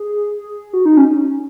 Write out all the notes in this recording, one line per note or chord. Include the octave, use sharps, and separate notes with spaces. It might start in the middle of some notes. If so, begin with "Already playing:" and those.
Already playing: G#4
F#4
D#4
C#4